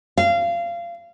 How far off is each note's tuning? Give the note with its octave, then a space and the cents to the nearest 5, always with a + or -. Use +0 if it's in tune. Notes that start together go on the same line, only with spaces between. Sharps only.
F5 -25